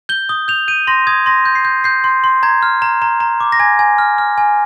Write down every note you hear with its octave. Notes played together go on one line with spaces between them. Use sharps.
G6 G7
D#6 G7
G6 F7
G6 D#7
C6 A#6
D#6 G#6
C6 A#6
G6
C7
G6
G6 C7
C6
C6
A#5 G#6
F6
A#5
A#5
A#5
D6
A#6
G#5 G#6
G#5
F6
F6
G#5